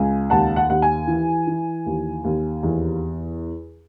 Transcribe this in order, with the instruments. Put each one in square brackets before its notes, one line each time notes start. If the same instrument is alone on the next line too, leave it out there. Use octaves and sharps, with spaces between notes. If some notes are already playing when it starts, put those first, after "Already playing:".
Already playing: [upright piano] C#2 G#5
D#2 F#5 A5
F#5
D#2 F#5
G#5
E3
E3
D#2
D#2
E2